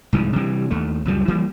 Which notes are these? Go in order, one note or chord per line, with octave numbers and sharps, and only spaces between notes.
C2 G#2 E3 F3
C3 E3 G3
D#2 A3
C#2 F#2 F3 G3
E3 G3 A#3